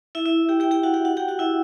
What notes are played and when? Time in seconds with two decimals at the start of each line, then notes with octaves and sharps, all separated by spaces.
0.15 E4 E5
0.26 E4 E5
0.49 G4 G5
0.60 G4 G5
0.71 G4 G5
0.83 F#4 F#5
0.94 G4 G5
1.05 F#4 F#5
1.17 G4 G5
1.28 F#4 F#5
1.39 E4 E5